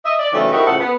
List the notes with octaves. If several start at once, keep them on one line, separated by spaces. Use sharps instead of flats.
D#5 E5
D5
C#3 E3 F#3 A3 C4 D#4
C4 D#4 E4 F#4 G4 A#4
F2 A2 C#3 A4 C5 F#5
B3